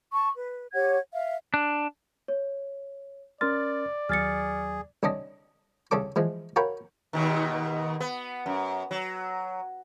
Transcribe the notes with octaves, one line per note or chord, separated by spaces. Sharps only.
A5 C#6
B4
G4 C#5 F#5 G#6
E5 F5
D4
C#5
C#4 A#4 D5 C6 F6 A6
D#2 F#3 G#4 F6 A6 C#7
C2 D3 C#4 D4 D#5
C2 C#3 C#4 A4 D6
E3 F3 G#3
F#4 A#4 C#5 F5 G5 B5
D#2 B2 D#3
B3
F#2
F#3